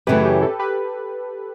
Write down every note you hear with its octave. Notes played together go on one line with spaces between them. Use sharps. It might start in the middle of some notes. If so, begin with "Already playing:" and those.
F#2 C#3 E3 A3 G4 B4
G4
A4
G4 B4